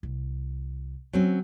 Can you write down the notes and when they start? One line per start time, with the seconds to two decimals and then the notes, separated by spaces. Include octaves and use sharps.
0.03 C2
1.13 D3 F#3 C4 C#4